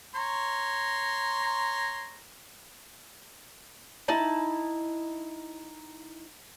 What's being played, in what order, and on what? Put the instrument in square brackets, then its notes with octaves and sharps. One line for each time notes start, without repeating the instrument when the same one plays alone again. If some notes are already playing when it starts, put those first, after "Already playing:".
[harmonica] C#5 A#5 C6
[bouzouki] D#4 E4 A5